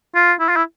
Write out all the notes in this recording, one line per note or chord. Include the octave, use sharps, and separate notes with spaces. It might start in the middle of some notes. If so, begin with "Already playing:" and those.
F4
E4
F4
E4